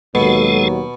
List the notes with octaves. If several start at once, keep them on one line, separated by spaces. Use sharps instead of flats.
D#2 B2 F#3 G#3 A4